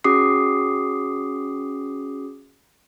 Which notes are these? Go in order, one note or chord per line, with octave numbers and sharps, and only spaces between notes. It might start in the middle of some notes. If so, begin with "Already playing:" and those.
C#4 F#4 G#4 D6 D#6 C7